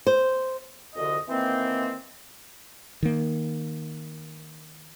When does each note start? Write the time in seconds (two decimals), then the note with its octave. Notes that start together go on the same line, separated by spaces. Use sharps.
0.07 C5
0.96 C2 F2 D3 F#4 D#5
1.29 D#3 E3 A#3 C4
3.03 D#3 A#3